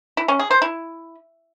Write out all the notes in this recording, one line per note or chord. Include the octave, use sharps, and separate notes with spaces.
E4
C#4
G#4
C5
E4